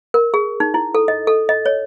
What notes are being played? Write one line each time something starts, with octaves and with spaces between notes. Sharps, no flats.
A#4
G#4
D#4
E4
A4
D#5
A4
D#5
C#5